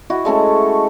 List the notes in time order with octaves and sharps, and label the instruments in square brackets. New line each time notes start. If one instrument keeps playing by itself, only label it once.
[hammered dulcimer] E4 F#4 D#5
G#3 A3 C#4 A4